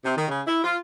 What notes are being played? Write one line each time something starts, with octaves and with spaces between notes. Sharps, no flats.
C3
D#3
C#3
E4
F4